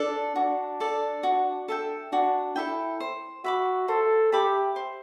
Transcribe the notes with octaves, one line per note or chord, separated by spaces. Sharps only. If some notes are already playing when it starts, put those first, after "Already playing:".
Already playing: D4 A4 D5
D4 F#4
A4 D5
F#4
A4 E5 G5
D4 F#4
E4 A4 E5 G5
C5
F#4 E5 B5 D6
A4 C5
G4 E5 B5 D6
C5